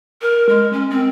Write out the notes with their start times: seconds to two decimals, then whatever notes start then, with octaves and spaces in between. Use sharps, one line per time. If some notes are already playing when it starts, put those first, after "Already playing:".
0.22 A#4
0.49 G#3
0.73 C#4
0.90 C4